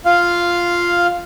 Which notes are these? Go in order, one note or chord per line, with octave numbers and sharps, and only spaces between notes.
F4 F5